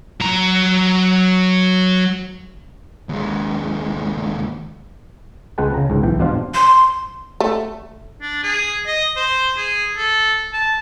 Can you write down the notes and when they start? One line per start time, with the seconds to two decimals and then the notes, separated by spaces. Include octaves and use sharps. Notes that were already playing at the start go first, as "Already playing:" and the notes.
0.21 F#3 A#5
3.09 D#2 G#3
5.58 C#2 G#3 B4 F#5 G5 A5
5.74 C#3 A#5
5.90 C#2 G#2
6.03 B1 E3 G5
6.19 G2 B2 F3 D4 F4 F5
6.54 C6
7.40 A3
8.21 D4
8.43 G#4
8.86 D#5
9.17 C5
9.57 G#4
9.97 A4
10.53 A5